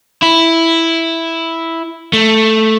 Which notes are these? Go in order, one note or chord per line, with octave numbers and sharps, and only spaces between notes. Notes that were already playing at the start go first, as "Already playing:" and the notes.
E4
A3